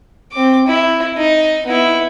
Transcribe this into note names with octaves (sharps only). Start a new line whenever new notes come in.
C4 D6
E4
D#4
B3 E4